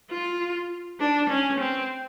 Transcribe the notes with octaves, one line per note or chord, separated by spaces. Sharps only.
F4
D4
C#4
C4